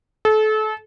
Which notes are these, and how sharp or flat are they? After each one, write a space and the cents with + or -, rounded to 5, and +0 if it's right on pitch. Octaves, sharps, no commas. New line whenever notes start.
A4 -30